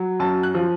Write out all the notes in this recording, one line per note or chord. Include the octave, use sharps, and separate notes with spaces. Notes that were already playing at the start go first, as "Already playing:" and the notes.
Already playing: F#3
F#2 A5
F#6
F3